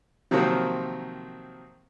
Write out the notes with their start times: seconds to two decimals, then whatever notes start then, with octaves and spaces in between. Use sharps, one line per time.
0.31 C3 D#3 F3 F#3 A#3 C4